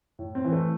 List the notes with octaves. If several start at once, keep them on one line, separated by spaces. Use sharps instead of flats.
A2
C4
E3
A3